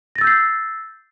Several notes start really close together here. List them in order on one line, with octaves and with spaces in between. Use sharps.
A#6 A6 E6 G6 C7